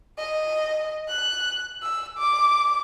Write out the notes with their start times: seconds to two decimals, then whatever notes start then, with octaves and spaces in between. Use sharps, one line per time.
0.18 D#5
1.09 F#6
1.82 E6
2.18 D6